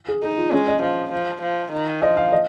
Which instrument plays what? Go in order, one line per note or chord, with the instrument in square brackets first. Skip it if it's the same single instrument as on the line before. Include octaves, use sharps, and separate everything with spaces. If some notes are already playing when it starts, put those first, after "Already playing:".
[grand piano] G#4
[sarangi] D#4 [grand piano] G#4
[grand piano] F4
[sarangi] G#3 [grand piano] C#4
[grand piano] D#5
[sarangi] F3 [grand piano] F5
[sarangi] F3
F3
D#3
[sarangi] F3 [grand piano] D#5
[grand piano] F5
D#5